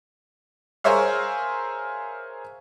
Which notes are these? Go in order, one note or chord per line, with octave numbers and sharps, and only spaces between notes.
G#4 A#4 C5 C#5 E5 F5